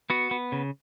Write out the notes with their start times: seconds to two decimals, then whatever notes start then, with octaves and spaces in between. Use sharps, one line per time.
0.10 B3 F#4
0.31 B3
0.52 C#3